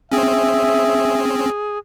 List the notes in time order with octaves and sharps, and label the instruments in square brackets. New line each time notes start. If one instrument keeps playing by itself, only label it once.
[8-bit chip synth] C4 C#4 [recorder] G#4 [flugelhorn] E5